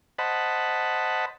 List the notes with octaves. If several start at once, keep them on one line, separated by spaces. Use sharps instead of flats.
C5 D#5 F#5 A5 B5